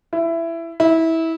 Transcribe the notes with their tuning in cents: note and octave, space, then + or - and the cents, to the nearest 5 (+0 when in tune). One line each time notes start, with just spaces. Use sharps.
E4 +15
E4 -20